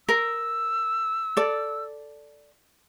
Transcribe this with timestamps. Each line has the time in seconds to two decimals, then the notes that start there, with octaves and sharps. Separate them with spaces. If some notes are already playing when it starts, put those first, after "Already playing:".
0.09 A#4 E6
1.37 A4 D5